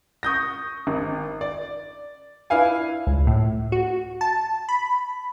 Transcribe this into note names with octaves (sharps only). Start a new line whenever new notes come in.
C#6 D#6 G6 A#6
G#1
D5
D4 E4 B4 F5 G#5
C#2
A2
F#4
A5
B5